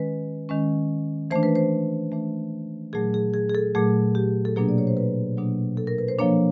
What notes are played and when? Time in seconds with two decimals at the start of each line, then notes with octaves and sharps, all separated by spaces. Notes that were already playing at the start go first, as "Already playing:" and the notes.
Already playing: D#3 G#3 C#4 B4
0.49 D#3 G#3 C#4
1.31 E3 A3 D4 C5
1.43 B4
1.55 C5
2.12 E3 A3 D4
2.93 A#2 F#3 A3 G#4
3.14 G#4
3.34 G#4
3.49 G#4
3.55 A4
3.75 A#2 F#3 A3 G#4
4.15 G4
4.45 A4
4.56 B2 F#3 A#3 D4 G#4
4.69 D5
4.78 C#5
4.87 C5
4.97 B4
5.37 B2 F#3 A#3 D4
5.77 A4
5.87 A#4
5.98 B4
6.08 C5
6.19 F3 A#3 D4 C#5